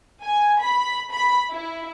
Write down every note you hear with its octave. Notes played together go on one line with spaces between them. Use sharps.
G#5
B5
B5
E4